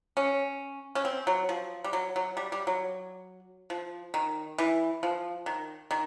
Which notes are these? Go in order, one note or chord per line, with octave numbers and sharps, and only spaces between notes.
C#4
C#4
C4
F#3
F3
G3
F#3
F#3
G3
G3
F#3
F3
D#3
E3
F3
D#3
D#3